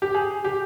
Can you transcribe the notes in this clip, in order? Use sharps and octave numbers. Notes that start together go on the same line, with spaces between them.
G4
G#4
G4